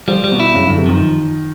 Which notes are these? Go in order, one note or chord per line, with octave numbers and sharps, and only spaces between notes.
F3 G3
G3
B2
E4
F#2 C#3
F#2 D3
C3
D#3 F3